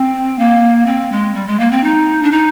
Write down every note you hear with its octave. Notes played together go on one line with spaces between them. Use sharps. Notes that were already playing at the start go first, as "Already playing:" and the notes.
Already playing: C4
A#3
C4
G#3
G3
G#3
A#3
C4
D#4
D4
D#4